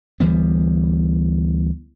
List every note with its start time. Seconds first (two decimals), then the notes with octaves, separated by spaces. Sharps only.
0.20 D2 E3 G3 B3